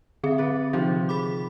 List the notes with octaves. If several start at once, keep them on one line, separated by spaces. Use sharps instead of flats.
D3 C4 G#4 E5
B4 D5
C3 D#3 F3 F5
G#4 B5 D6